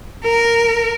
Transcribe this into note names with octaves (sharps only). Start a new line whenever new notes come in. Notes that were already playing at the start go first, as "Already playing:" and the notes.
A#4